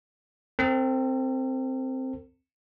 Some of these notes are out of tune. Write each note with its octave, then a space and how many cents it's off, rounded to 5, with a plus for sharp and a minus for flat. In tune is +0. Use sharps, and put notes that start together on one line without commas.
C4 +0 A4 +45